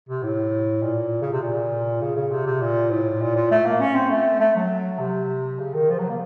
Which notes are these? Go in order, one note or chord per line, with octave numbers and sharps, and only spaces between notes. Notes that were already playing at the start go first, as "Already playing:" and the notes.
C3
A2
A#2
C#3
C3
A#2
C#3
C#3
C3
C3
A#2
A2
A#2
A#2
A3
A#3
C#4
C4
A3
A3
F#3
C3
C#3
D#3
F3
F#3
A#3